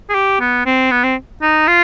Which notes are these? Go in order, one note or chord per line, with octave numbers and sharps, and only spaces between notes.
G#4
G4
B3
C4
B3
C4
D#4
F4